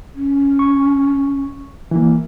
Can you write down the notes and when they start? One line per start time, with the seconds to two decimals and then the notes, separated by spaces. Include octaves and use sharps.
0.15 C#4
0.59 C#6
1.91 E3 A#3